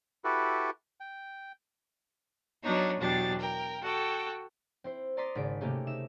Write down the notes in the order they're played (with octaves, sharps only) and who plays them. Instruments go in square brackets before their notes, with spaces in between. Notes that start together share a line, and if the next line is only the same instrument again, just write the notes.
[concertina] E4 F#4 G4 A4 B4
G5
[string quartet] F#3 B3 D4 D#4 C#5
E2 B2 F#3 D4 G4 A6
A#4 G5
F#4 A4 G5
[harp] C4 E4 C5
D5 A#5 C6 D#6 A6 B6
G#1 C#3 B6 D7
C3 A3 A#3 C#4 D#4 G4
D#4 E5 E7